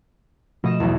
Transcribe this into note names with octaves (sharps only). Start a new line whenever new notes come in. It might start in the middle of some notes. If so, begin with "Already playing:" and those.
B2 F3 A3 D#5 E7
B1 E2